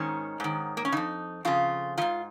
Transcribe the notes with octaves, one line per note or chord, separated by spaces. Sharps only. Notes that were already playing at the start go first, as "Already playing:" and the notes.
Already playing: G#2 D#3 C#4
G#2 D#3
A#3
C#4
F2 C#3 D#4
F2 C#3 F4
G#2 D#3 F4